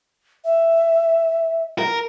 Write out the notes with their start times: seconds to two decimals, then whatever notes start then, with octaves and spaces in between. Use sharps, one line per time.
0.44 E5
1.79 A#4